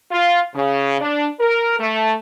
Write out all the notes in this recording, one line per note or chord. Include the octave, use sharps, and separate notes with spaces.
F4
C#3
D4
A#4
A3